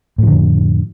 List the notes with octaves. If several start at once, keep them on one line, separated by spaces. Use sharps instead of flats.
F2 A2 D3 F3